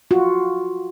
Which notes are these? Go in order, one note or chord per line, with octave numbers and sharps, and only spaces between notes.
F4 F#4